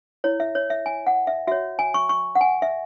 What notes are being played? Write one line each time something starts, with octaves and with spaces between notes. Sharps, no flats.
E4 C#5
E5
C#5
E5
G#5
F#5
E5
F#4 C#5 E5
G#5
C#6
C#6
F#5
G#5
E5